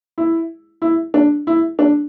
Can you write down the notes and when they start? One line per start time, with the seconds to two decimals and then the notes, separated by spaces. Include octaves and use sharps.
0.18 E4
0.82 E4
1.14 D4
1.47 E4
1.79 D4